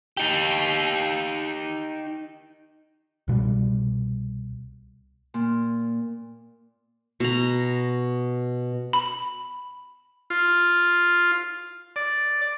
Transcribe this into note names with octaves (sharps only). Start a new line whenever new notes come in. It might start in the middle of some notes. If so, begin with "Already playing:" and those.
D#4 G4
C2 B2 F#3 G3
A#2
B2 A#5
B5
F4
D5